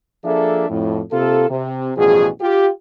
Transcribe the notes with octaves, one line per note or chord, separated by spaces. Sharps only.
F3 A#3 D4 G#4 A4 E5
F2 A2
C3 A#3 F4 A4
C3
A1 G2 B2 F3 F#4 G#4
F4 G4